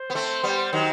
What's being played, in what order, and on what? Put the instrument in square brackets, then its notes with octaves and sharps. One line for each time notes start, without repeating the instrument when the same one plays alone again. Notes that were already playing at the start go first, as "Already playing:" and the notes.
Already playing: [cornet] C5
[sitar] B3
A3 C4
G3 B3
D#3 F#3